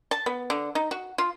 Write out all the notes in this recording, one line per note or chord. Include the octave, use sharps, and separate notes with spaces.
A5
B3
D3
D#4
F#4
F4